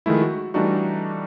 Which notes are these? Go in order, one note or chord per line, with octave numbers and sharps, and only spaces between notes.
D#3 F3 G#3 A3 E4
F#4
E3 G3 A3 D4 D#4 F#4